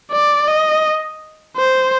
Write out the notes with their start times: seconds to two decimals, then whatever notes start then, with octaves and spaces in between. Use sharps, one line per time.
0.11 D5
0.48 D#5
1.56 C5